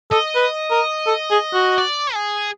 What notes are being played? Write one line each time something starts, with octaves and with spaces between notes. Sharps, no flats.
A4 D#5
B4
A#4
A4
G#4
F#4
D5
G#4